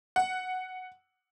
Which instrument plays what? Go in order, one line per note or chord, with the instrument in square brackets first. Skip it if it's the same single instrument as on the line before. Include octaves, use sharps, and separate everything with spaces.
[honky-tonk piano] F#5